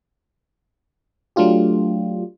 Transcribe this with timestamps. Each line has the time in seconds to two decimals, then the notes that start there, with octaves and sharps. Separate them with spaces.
1.36 F#3 A3 D4 F4 G4